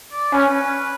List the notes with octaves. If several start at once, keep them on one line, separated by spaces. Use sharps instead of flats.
D5
C#4 B4